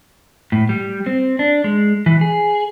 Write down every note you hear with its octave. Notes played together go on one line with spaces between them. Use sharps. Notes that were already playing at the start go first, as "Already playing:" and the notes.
A2
G3
C4
D4
G#3
E3
G#4